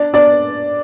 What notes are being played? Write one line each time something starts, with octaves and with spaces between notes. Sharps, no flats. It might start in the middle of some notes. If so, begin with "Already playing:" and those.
Already playing: D4 D5
D4 D5